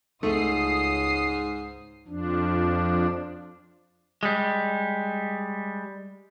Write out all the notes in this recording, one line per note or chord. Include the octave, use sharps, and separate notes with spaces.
C#2 G#2 A3 D#6 C7
F2 F3 D4
G3 G#3